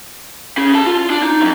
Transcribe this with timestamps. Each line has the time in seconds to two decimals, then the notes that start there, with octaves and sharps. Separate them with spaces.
0.58 C#4 G#4
0.74 G#4 A5
0.86 F4
1.10 D4
1.23 D#4
1.41 F2 C3